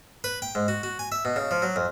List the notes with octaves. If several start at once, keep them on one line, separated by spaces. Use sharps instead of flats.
B4
G5
G#2
F#4
F#4
G#5
E5
B2
C#3
F3
F#3
F2